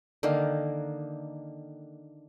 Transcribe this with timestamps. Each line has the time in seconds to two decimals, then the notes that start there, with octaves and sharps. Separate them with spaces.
0.23 D3 D#3 A#3